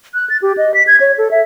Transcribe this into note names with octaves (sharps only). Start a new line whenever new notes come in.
F#6
A6
G4
D#5
B6
G#6
C#5
A4
E5